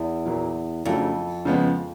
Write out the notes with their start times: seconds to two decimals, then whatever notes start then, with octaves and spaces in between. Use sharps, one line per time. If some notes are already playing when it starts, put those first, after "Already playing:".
Already playing: E2
0.26 A#2 F#3 A#3
0.85 F2 C#3 F#3 A3 D4
1.45 C#3 F3 G#3 B3